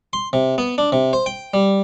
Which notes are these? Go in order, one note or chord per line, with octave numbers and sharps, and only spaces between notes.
C6
C3
B3
D4
C3
C5
G5
G3